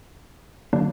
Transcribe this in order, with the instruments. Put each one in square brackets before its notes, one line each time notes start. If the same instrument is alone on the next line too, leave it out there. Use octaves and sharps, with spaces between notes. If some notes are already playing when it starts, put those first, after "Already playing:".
[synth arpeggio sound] D3 F#3 A#3 D4